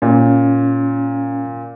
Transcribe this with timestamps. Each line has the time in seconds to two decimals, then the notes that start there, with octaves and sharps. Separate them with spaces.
0.02 A#2 C#4